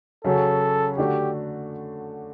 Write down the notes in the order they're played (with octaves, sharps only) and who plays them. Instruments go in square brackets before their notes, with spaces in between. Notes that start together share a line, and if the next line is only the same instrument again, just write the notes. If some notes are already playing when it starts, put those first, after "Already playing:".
[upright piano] C#3 F#3 C#4 F#4 [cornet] A4
[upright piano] D3 A3 D4 F#4 [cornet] G4